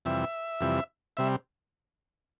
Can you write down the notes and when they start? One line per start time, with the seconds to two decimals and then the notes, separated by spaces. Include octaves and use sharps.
0.05 F2 C3 E3 G3 E5
0.60 F2 C3 E3 G3
1.17 C3 G3 E5